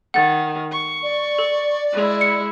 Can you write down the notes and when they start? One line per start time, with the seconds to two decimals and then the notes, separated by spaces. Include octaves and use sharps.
0.14 D#3 F#5 A6
0.72 C#6
1.03 D5
1.39 A4
1.93 G#3 E4
2.21 C#7